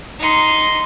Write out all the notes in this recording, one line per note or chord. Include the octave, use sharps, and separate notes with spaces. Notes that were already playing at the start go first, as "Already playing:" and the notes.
D#4 C6